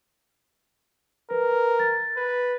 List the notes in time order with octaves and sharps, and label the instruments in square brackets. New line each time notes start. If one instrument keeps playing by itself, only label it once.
[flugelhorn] A#4 [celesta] B4
[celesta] A6
[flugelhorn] B4